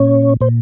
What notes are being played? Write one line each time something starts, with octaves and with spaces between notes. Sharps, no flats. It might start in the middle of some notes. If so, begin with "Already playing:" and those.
Already playing: A#2 C#4 C#5
A#2 C5